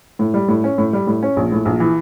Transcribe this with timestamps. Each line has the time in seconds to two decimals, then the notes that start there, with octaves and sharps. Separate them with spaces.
0.19 A2
0.34 G3
0.48 A2
0.64 C#4
0.78 A2
0.93 G3
1.07 A2
1.23 C#4
1.36 A#1
1.52 A2
1.65 A#1
1.80 E3